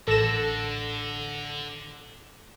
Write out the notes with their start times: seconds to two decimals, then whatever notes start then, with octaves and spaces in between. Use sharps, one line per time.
0.08 A1 D3 A4 A#6 E7